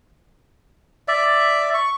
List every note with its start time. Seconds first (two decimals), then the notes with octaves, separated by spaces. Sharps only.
1.08 D5 E5
1.74 C#6